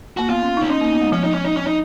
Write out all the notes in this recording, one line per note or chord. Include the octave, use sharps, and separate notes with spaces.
A#3 F#4
B3 F4
C#4
C#4 D#4
C#4 D#4
A#3
B3
G#3
F3 C#4
D#4
C#4
D#4
C#4
D#4